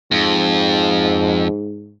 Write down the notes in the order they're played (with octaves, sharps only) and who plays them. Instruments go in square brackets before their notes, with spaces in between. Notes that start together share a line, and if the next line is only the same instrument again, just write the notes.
[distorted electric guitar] F2 [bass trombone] G#2